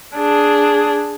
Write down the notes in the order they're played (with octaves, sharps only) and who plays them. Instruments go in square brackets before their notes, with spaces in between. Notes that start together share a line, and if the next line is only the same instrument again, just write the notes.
[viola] D4 G#4